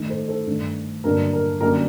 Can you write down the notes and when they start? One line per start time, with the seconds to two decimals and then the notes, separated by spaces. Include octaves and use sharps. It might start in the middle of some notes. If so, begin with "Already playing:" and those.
Already playing: D#3 A3 D#4
0.09 A4 C5
0.28 A4 C5
0.47 G2 D#3 A3 D4
1.04 G2 D3 F#3 A#3 D4 A#4
1.33 A#4
1.61 F#2 D3 G3 A#3 D4 A#4